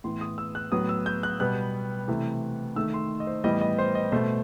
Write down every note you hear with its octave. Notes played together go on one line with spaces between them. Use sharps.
A2 E3 B3 C6
D#6
E6
F#6
A2 F#3 B3 D#6
E6
G6
F#6
B2 G3 B3 F#6
C3 E3 A3
D#3 A3 E6
C6
D#5
C5
A2 E3 G3 B3 D#5
D#5
C5
D#5
B2 A3 C5